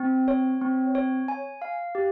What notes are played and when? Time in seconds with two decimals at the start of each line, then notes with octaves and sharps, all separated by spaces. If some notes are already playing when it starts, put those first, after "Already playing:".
Already playing: C4
0.28 C#5
0.61 C4
0.95 C#5
1.28 G#5
1.62 F5
1.95 G4